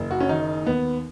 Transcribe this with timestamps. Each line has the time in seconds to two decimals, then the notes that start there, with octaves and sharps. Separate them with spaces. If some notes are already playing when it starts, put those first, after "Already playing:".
Already playing: F#1
0.11 F#4
0.21 C#4
0.29 D#3 D#4
0.66 D#2 B3